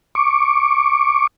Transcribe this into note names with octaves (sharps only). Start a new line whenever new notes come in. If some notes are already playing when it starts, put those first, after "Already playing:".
C#6 D6